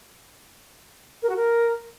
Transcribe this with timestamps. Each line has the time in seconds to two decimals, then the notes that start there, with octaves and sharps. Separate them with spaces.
1.22 A#4
1.29 F#4
1.36 A#4